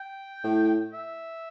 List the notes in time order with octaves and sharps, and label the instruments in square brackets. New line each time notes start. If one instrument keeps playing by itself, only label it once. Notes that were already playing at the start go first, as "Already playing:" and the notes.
Already playing: [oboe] G5
[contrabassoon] A2
[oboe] E5